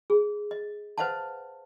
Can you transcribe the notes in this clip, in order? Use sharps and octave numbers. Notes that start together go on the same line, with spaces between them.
G#4
D#5
B4 C5 D#5 F5 F#5 A5